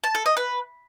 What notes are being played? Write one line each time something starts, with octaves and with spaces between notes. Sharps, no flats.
A5
A4
D#5
B4